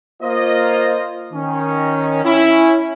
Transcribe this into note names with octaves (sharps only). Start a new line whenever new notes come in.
A#3 F4 C5 D#5
D#3 C#4
C#4 E4